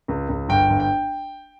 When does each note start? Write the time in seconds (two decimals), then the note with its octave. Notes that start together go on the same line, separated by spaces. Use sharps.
0.08 C#2
0.29 C#2
0.48 G1 G5
0.70 G1
0.80 G5